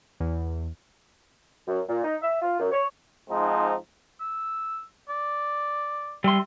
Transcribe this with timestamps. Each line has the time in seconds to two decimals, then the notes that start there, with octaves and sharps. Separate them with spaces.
0.20 E2
1.68 F#2
1.89 A#2
2.04 D#4
2.22 E5
2.42 F4
2.60 F#2
2.72 C#5
3.29 G#2 F3 G#3 C4 D#4
4.20 E6
5.09 D5
6.24 G3 E5 C6